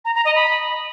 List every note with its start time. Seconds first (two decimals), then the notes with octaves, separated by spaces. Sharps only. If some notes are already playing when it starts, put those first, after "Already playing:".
0.05 A#5
0.15 A#5
0.25 D#5
0.35 B5